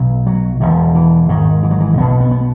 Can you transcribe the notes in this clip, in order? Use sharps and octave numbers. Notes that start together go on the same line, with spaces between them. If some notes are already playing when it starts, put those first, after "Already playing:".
Already playing: B1 B2
F#3
E1 E2 B2
E3
G#1 G#2 D#3
E3
F#3
E3
B1 B2 B3
B3
B3